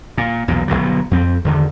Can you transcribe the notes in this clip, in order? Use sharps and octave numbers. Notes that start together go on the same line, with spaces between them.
A#2
B1 E2 A#2
G1 D2 B2 F#3
F2 C4
E2 D3 D#3